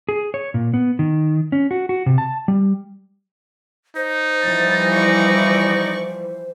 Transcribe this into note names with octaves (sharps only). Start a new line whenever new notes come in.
G#4
C#5
A#2
B3
D#3
C#4
F#4
F#4
C3
A5
G3
D#4 C5
E3 F3 G3 A6
D5 C#6